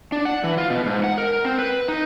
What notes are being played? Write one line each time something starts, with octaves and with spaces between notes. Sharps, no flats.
D4
F#5
E3
F4
B2
G#2
F#5
A#4
C4
B4
D#4